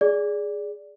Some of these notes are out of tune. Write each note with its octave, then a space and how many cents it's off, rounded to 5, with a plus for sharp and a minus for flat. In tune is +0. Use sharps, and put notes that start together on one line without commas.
G#4 +0 D5 -10